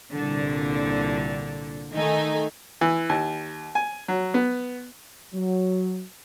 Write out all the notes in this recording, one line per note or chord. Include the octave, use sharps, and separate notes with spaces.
C2 A#2 D3
D#3 A3 D#4 G#5
E3
D#2
G#5
F#3
B3
F#3